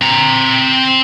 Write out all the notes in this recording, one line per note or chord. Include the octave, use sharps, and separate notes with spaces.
C4 A#5